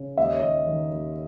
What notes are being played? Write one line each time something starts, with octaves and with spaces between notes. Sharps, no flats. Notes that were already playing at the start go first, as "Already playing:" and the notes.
Already playing: C#3
D#2 E5
D#5
C#5
D#2 D#5
D#3
D#2